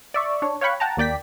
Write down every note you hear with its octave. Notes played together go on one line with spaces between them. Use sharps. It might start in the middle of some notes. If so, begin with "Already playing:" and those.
D5 E5 C#6
D4 C#5
C#5 F5 G5 B5 C#6 F#6
F#5 G5 A5 A#5
D#2 A#3 D5 G5 B6